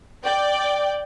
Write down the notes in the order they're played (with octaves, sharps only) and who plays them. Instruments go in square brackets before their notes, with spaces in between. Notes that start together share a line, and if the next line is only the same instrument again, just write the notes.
[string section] D5 G5